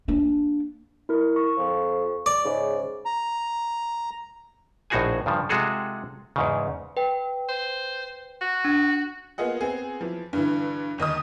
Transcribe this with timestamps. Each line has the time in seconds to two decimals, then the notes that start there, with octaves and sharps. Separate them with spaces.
0.08 A#3 D4
1.09 E4 A#4
1.36 C#6
1.57 F2 F3
2.26 D5 D6
2.44 G#2 C#3
3.05 A#5
4.90 A#1 A2 D#4 F#4 G#4 G#5
5.26 G2 C#3 F3
5.49 C3 G#3 F4 F#4 G#4 A4
6.36 E2 G#2 C#3
6.97 B4 G5
7.49 C5
8.41 F#4
8.65 D4
9.38 A#3 B3 F4 G#4 D#5 F#5
9.61 B3 C4 G#4
10.01 E3 F3
10.33 G2 D3 E3
10.98 G1 D#2 D#5 D#6